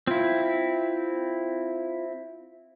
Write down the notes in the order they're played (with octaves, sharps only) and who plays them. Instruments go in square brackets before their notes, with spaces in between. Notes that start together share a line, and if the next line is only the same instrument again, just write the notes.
[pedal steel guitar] C4 E4 [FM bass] F4